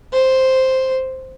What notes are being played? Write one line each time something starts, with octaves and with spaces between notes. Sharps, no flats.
C5